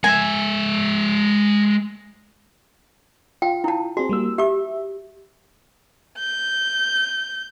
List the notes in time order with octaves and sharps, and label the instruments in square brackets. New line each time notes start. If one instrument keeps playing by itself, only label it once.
[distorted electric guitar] G#3 E5 [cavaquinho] G#5
[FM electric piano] F4 [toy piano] G5
[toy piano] E4 A5
[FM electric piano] C4 G#4 [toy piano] F#4
[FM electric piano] G3 A#3 E6
[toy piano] G4 D6 [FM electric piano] E5
[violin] G6